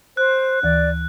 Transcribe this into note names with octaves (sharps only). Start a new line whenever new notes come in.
C5 F#6
D2 E3 D5